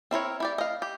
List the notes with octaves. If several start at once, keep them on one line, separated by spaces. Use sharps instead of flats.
C4 E4 A#4 C#5
E4 G4 D5
D#5 F5
G4